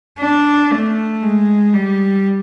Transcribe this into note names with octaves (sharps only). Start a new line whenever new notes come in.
D4
A3
G#3
G3